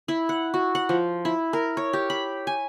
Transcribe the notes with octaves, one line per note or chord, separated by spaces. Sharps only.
E4
F#5
F#4
F#5
F3
E4
A#4
C#5
G4
B5
G#5